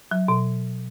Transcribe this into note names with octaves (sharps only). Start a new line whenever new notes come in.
F#3
B2